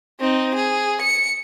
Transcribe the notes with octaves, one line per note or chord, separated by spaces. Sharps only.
C4 D#4
G#4
C#7